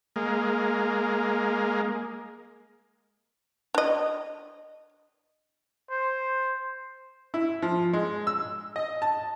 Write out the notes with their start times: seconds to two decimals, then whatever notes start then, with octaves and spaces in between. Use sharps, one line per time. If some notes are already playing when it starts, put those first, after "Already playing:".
0.16 G#3 A#3
3.75 D4 D#5
5.90 C5
7.34 E4
7.62 F3
7.93 G#3
8.27 E6
8.76 D#5
9.02 A5